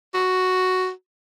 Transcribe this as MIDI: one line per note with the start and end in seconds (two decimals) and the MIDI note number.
0.14 0.90 66